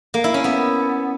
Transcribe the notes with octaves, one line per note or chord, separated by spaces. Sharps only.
A#3
E4
C#4
B3